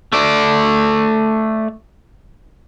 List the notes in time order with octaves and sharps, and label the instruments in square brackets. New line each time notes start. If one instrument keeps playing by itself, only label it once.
[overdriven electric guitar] A3 D5